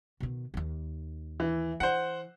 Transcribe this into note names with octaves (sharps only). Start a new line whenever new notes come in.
B2 D#3
D#2 D#3
E3
E3 C5 F#5